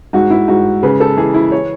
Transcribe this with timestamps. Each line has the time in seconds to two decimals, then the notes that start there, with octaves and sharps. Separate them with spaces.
0.13 G#2 F#4
0.30 E4
0.48 G#2 F#4
0.83 C#3 B4
1.00 A4
1.17 E3 G#4
1.34 E4
1.52 C#5